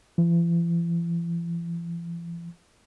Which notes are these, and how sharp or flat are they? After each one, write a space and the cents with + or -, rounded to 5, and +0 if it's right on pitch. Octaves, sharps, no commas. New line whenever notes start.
E3 +45